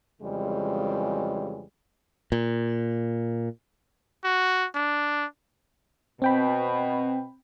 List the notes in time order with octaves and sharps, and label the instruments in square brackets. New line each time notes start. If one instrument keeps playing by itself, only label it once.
[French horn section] F2 C#3 E3 G3 G#3
[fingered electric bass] A#2
[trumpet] F#4
D4
[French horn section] B2 [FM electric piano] C4 G5 B5